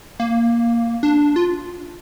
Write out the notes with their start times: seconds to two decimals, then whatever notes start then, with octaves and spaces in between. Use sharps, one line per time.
0.20 A#3
1.03 D4
1.36 F4